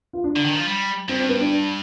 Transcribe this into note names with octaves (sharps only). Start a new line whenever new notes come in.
F4
D4
D3
D#3
F3
G3
G2 C4
C4
B3
D4